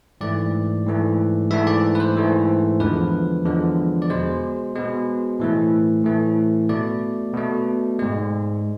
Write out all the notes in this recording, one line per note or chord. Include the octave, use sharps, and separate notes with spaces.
G#2 E3 A3 D5
G#2 E3 A3
G#2 E3 A3 E5
D5
B4
C5
G#2 E3 A3
E2 D3 F3 G#3 B4
E2 D3 F3 G#3
D5
B2 G#3 C5
B2 G#3
A2 E3 A3
A2 E3 A3
B2 A3 D5
B2 A3
G#2 G#3